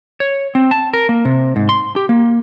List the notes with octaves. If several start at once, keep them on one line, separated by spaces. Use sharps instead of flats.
C#5
C4
A5
A#4
A#3
C3
G#2
C6
G4
A#3